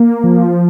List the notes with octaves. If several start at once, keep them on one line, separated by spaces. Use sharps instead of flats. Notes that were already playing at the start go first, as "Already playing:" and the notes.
Already playing: A#3
F3